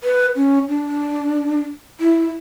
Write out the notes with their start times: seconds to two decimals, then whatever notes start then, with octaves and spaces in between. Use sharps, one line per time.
0.04 B4
0.36 C#4
0.69 D4
2.00 E4